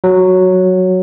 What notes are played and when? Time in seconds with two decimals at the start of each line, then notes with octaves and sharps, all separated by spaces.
0.04 F#3